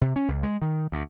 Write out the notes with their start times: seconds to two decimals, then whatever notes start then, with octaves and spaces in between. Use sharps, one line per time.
0.01 C3
0.16 C#4
0.28 C#2
0.43 G#3
0.62 D#3
0.92 D2